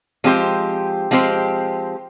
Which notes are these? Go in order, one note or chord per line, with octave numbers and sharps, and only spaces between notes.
F3 G#3 C4 G4 C5
F3 G#3 C4 G4 C5